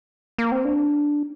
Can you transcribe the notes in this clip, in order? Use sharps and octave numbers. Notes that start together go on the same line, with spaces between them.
A#3
C4
D4